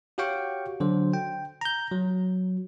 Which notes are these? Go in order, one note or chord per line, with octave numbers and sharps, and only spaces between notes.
F#4 G4 C#5 F5 G5 C#6
D3 F#3 C5
G5
A#5 G6
F#3